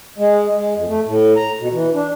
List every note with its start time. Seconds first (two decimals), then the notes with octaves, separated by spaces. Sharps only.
0.18 G#3
0.55 G#3
0.75 F2
0.88 A3
1.06 A2
1.37 A#5
1.60 B2
1.72 E3
1.94 D4